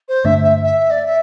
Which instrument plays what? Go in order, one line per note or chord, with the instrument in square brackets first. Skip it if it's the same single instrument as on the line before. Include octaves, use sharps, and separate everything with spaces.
[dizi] C5
[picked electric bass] G2 D3 A3 D4 [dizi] E5
[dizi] E5
E5
D5
E5